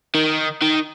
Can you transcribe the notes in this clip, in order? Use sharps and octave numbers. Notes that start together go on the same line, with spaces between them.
D#3
D#3